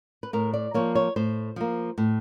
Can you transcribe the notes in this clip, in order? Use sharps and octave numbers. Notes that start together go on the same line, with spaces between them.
B4
A2 A#4
D5
F3 A#3 C#5
C#5
A2 C5
F3 A#3
A2